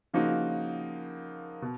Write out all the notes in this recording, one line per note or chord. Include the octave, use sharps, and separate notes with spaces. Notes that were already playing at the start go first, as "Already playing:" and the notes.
C#3 F3 A#3 D#4 F#4
B2